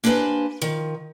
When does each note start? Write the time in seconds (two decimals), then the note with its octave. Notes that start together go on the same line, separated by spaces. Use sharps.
0.04 A#3 D4 G4 B4 C5 G#5
0.62 D#3 F3